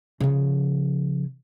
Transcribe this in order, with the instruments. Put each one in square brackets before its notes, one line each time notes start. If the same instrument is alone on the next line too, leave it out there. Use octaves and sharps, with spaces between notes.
[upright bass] C#3 F3